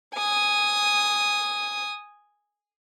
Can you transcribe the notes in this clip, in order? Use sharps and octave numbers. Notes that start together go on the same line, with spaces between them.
G#5 D#6